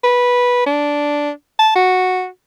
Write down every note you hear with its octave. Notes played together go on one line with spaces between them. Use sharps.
B4
D4
A5
F#4